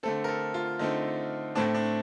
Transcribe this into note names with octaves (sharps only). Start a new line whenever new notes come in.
D3 A3 C4 A4
A#4
A4
F4
D3 A3 C4 D#4
A2 A3 C4 D4
D4